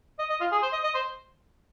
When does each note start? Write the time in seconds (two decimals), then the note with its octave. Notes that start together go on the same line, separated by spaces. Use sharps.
0.19 D#5
0.30 D#5
0.41 F4
0.52 G#4
0.63 C5
0.73 D#5
0.83 D#5
0.95 C5